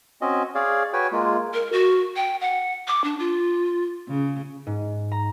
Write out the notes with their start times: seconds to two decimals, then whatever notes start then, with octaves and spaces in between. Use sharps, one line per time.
0.21 C4 C#4 F#4 D#5
0.55 G#4 C#5 D5 F5
0.93 F#4 B4 C#5 G5 G#5
1.12 G#3 A#3 F4
1.54 A#4
1.72 F#4
2.16 G5
2.41 F#5
2.88 D6
3.04 D4
3.19 F4
4.08 C#3
4.67 G#2
5.12 A#5